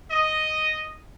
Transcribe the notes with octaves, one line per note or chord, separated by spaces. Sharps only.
D#5